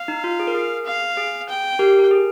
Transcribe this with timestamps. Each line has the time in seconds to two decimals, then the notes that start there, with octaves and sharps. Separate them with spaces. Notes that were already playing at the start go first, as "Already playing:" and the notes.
Already playing: F5
0.08 D#4
0.24 F4
0.40 G#4
0.47 A#4
0.54 G#4
0.85 F5
1.17 G#4
1.49 G5
1.79 G4 A#4
1.99 A#4
2.11 G#4